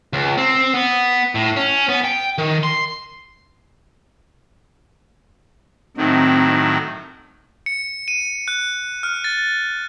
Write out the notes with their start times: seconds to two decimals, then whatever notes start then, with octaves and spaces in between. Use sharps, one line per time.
0.13 C#2
0.38 C4
0.74 B3
1.35 A2
1.56 C#4
1.89 B3
2.04 G5
2.38 D#3
2.63 C6
5.97 A2 D#3 F#3 C4 D#4
7.66 C#7
8.08 D#7
8.48 F#6
9.03 F6
9.24 A6